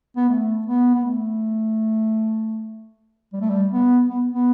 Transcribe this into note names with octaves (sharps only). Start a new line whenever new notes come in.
B3
A3
B3
B3
A3
G3
A3
G3
B3
B3
B3